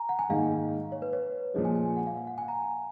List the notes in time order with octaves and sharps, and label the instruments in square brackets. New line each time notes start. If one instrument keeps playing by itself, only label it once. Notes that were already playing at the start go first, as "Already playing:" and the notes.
Already playing: [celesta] G#5 A#5
F#5
G#5
[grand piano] G#2 D#3 A#3 D#4 [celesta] F5
[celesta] C#5
B4
C#5
[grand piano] A#2 F3 G#3 [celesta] D#5
[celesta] G#5
G#5
G#5
F#5
F5
F5
F#5
G#5
A#5